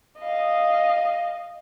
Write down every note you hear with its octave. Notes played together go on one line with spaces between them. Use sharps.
D#5 F5